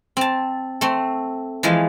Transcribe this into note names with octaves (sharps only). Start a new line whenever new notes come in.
C4 A5
A3 C4
E3 F3 G#3 F5